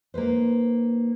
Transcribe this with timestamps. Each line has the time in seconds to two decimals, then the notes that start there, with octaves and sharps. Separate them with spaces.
0.14 A#3 D#4 B4 C5